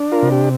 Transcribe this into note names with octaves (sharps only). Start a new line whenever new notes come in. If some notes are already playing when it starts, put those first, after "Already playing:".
Already playing: D4
F4 A#4
C3
G4